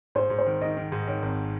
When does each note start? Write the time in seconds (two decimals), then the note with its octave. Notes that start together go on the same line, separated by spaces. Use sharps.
0.15 G#2 C5
0.30 G#2
0.38 C5
0.46 D#3
0.61 D#3 D#5
0.77 D#3
0.92 G#2
1.07 D#3 C#5
1.22 G#1